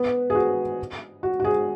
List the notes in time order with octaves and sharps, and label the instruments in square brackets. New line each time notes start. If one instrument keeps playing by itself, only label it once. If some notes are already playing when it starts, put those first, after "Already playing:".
Already playing: [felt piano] B3
G#4
F#4
F#4
F#4
G#4